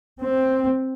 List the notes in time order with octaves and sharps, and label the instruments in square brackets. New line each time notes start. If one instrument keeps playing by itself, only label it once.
[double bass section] C4